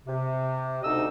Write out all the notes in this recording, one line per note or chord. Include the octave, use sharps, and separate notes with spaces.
C3
D2 D#4 D#5 E6